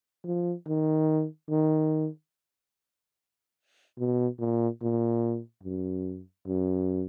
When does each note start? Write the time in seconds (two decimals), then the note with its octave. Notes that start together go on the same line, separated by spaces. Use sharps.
0.24 F3
0.67 D#3
1.49 D#3
3.98 B2
4.39 A#2
4.81 A#2
5.63 F#2
6.47 F#2